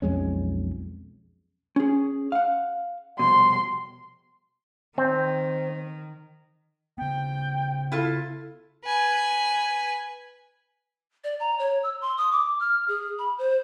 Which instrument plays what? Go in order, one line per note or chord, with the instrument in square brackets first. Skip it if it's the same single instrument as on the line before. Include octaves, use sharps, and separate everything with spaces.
[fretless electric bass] B1 F2 G#3 C#4
[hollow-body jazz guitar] C#4 G#4
F5 F#5
[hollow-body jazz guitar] C2 F2 B2 [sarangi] C6
[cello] D#3 [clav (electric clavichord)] C4
[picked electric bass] C#3 B3 [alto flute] G5
[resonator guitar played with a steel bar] E4 F4 A4
[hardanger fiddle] B4 G#5
[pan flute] D5
A#5
C#5
E6
C6
D#6
D6
F6
G#4
B5
C5